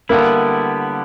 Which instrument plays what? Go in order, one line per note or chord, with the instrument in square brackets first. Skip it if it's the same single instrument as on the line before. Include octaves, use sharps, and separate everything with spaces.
[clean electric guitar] D3 G3 B3 E4 [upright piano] A#3